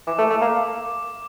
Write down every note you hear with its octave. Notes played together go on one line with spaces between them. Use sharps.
E3 D6
A3
A3
A#3